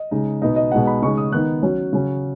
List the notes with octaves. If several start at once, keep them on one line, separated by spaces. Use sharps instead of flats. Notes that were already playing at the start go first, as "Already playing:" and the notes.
Already playing: D#5
C#3 G#3 D#4
B2 B3 D#4 D#5
D#5
B2 G#3 D#4 F#5
B5
C#3 G#3 D#4 C#6
D#6
D#3 B3 D#4 F#6
F#3 C#4
C#3 F#3 C#4